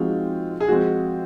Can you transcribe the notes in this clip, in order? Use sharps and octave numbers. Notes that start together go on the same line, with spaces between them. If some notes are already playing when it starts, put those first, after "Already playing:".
Already playing: F3 G#3 C4 D#4 F4 F#4
G#4
F3 G#3 C4 F#4